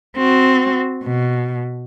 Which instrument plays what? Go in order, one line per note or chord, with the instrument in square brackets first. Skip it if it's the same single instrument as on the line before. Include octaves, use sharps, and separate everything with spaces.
[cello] C4 F#4
B2